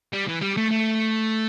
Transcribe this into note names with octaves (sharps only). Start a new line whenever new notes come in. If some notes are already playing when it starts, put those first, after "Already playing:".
G3
E3
G3
A3
A3